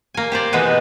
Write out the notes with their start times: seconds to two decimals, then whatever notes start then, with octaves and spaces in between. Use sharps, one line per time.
0.14 A#3 G#5
0.32 G4 C5 D5
0.53 B2 E3 G#3 B3 D#4 B4